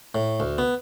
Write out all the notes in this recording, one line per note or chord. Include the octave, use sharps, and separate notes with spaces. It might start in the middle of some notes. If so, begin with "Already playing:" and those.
A2
D2
B3